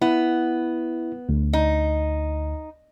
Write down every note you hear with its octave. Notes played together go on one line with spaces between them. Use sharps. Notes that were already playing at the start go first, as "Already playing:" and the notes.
B3 E4
D2
D#4